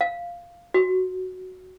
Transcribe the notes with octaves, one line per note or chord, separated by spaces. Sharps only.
F5
F#4